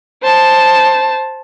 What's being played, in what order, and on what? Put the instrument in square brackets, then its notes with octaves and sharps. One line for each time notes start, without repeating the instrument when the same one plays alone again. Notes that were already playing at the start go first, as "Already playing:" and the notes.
[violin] C5 A5